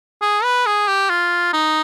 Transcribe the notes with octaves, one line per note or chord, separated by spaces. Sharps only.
G#4
B4
G#4
G4
F4
D#4